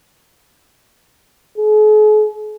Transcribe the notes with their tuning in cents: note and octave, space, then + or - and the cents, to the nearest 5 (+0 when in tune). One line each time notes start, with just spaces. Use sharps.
G#4 +45